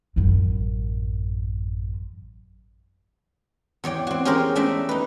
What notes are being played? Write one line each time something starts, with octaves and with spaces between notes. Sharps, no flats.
A1 F#2
E2 C#5 D5 G5
C4 F#4
C#4 G4 G#4 A#4 C5
A3 C#4 D4 E5
D#4 B4